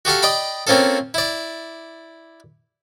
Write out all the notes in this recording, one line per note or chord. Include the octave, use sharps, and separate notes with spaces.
F#4 G4 A4 F5
D5 D#5 G5 B5
A#3 C4 C#4 F4 A4
E4 D5